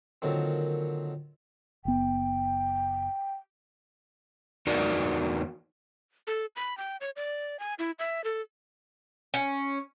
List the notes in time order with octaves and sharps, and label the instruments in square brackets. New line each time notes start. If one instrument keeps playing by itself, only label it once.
[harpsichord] A#2 D3 D#3 F#3 C4
[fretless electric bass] F#1 B3 [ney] G5
[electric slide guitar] E2 D4 D#4 F#4 A#4 D5
[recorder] A4
B5
G5
C#5
D5
G#5
E4
E5
A4
[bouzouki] C#4